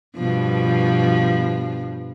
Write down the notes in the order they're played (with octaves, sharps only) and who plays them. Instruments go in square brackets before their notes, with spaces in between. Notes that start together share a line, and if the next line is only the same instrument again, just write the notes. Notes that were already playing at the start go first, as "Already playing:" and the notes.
[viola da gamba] G2 B2 F3